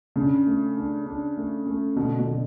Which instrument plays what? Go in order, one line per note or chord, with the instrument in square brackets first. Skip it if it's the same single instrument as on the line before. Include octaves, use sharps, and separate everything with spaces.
[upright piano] C#3 [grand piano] D4
[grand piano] A3
D4
D4
A3
A3
[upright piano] B2 [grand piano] D3
[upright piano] B2
[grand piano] D3